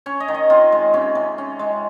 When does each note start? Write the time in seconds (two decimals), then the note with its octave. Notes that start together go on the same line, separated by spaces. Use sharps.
0.06 C#4 C#5
0.20 D#5
0.28 D#3
0.34 D#5
0.50 C4 F4
0.72 G#3
0.94 C3 C#4
1.15 C3
1.38 C#4
1.59 G#3